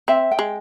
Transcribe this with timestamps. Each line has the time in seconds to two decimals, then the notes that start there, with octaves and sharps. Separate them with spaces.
0.08 C4 E5
0.31 G5
0.39 G#3